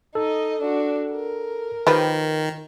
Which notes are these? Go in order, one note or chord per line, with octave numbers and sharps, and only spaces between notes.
D#4 A4 D#5
D4 F#4
A#4
D#3 F3 G4 B4